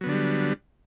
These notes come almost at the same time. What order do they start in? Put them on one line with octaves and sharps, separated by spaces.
F#3 B3 D3 D4 G3